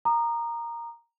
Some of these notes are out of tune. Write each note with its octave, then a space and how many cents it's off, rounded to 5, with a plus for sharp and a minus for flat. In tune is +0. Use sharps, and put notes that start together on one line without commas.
A#5 +0 D#6 -35